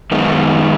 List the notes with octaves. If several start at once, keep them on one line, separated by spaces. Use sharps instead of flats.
F#2 D#3 G#3 B3